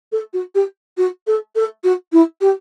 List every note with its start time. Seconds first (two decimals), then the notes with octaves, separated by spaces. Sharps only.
0.12 A4
0.33 F#4
0.55 G4
0.98 F#4
1.27 A4
1.56 A4
1.84 F#4
2.13 E4
2.41 G4